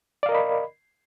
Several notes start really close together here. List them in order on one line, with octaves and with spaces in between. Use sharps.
D5 F5 A#4 D#5 B5